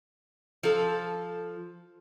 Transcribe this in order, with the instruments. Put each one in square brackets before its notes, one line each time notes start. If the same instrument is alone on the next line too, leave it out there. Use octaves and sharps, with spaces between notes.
[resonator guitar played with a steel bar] F3 A4